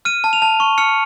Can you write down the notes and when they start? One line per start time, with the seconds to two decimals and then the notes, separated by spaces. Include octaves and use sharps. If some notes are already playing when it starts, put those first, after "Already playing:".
0.05 F6 D#7
0.24 A5
0.33 F7
0.42 A5
0.60 C#6
0.78 F6 C#7